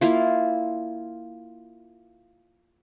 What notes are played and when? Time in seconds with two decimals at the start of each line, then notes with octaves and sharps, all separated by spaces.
0.01 A#3 E4 F4